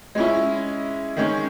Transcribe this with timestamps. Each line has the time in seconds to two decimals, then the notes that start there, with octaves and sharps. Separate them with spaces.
0.15 G#3 C#4 E4
1.17 D#3 G#3 C#4